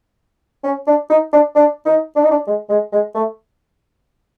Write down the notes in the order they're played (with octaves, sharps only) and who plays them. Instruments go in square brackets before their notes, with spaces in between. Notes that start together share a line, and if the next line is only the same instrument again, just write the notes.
[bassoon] C#4
D4
D#4
D4
D4
D#4
D4
D#4
D4
G#3
G#3
G#3
A3